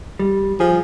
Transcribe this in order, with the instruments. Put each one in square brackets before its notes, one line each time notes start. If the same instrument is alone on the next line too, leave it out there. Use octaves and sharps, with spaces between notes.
[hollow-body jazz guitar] G3
[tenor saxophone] F3 [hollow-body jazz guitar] G#4